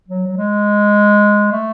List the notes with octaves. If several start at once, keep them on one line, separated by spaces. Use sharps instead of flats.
F#3
F#3
G#3
A3